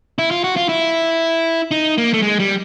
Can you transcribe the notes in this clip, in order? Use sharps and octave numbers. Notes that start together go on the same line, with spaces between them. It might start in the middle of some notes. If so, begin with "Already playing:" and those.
E4
F4
F#4
F4
E4
D#4
A#3
A3
G#3
G3